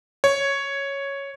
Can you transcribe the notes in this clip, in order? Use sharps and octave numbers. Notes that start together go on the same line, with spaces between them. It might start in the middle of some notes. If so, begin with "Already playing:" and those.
C#5